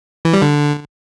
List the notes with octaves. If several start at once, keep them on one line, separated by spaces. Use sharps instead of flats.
E3
G3
D3